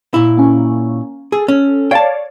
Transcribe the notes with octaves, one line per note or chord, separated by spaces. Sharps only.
A#2 E4
A#3 C#4
G#4 A4
C#4
C#5 D5 F5 G5 A5